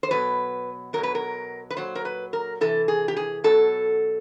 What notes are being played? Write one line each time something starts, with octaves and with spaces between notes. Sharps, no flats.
C5
B2 F#3 B4
B2 F#3 A#4
B4
A#4
B4
A#2 F#3 C5
A#4
B4
A#4
C3 E3 A4
G#4
G4
G#4
B2 F#3 A4